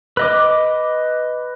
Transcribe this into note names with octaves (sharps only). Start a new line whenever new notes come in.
B4 D#5 D6